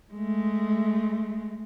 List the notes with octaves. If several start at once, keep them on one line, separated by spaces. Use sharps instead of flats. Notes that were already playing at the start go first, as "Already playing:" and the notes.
G#3 A3